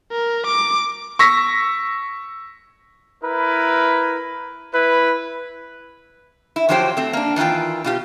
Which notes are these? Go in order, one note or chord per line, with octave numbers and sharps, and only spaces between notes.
A#4
D6
C#6 E6 A#6 B6
E4 A#4 B4
E4 B4
E4
F2 F3 F#3 G4 C5 G5
A3 C4
A#3 D4
D#3 E3 D4 F4 G5
B2 F4 G4